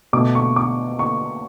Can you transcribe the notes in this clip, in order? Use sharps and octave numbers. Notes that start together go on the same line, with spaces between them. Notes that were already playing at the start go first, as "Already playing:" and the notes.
B2 A3 D6
C#6
D6
C#6